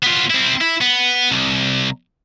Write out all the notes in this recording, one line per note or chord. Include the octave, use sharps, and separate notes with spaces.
B3 F4
C4 E4
E4
B3
C2